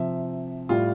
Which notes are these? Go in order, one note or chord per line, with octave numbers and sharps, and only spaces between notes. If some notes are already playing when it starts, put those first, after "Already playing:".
Already playing: C3 F3 E5
A2 G3 F4